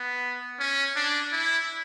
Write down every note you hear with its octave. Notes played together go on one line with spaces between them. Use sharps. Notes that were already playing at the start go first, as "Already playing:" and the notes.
Already playing: B3
C#4
D4
E4